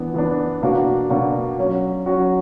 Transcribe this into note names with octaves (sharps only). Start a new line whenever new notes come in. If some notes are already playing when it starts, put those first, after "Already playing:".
Already playing: E3 B3 D4
E3 B3 D4
B2 A#3 D4 F#4
B2 A#3 D4 F#4
F#3 C#4 F#4
F#3 C#4 F#4